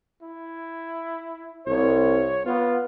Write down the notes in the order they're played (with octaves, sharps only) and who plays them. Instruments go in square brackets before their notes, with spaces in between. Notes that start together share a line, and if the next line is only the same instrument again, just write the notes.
[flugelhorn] E4
[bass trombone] C2 [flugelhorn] C#5
[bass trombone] B3 [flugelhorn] F4